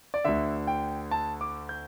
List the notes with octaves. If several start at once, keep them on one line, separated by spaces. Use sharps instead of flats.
D5
D2 D3 E5
G5
A5
D6
G6